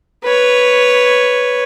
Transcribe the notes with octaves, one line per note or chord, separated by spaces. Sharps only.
B4 C#5